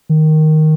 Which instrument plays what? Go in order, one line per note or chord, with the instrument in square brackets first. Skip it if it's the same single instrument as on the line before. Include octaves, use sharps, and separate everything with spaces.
[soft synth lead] D#3